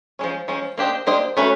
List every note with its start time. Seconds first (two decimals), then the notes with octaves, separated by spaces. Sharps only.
0.19 F3 G#3 C#4
0.48 F3 G#3 C#4
0.78 A#3 D4 G4 C5 D#5
1.07 A#3 D4 G4 C5 D#5
1.37 A3 C#4 F#4 B4